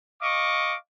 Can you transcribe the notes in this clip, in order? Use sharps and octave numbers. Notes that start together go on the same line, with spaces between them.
D#5 F5 C#6 D6